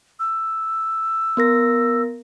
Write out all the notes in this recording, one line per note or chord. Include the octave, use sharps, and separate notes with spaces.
E6
B3 A#4 A#6